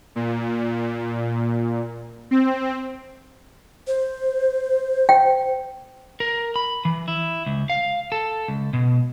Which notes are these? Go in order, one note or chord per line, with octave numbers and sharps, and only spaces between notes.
A#2
C4
C5
G5
A#4
B5
E3
E4
C#2
F5
A4
C#2
B2